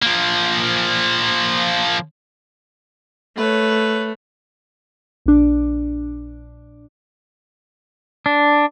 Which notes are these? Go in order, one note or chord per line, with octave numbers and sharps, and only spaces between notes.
F3 A#3
A3 B4 C#5
A#1 D4
D4